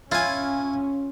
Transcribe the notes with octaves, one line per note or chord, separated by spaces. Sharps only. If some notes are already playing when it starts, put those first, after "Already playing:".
C#4 E4 F4 G#5